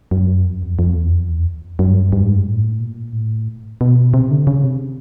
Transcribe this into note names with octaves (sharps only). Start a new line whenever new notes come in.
F#2
F2
F#2
F2
F2
E2
F2
E2
F#2
G2
F#2
G2
G#2
G2
A2
A#2
A2
B2
C3
D3
C#3
C3